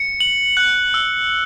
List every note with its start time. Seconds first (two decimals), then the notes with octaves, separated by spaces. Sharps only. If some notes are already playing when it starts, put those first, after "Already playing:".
Already playing: C#7
0.20 F#7
0.57 F#6
0.94 E6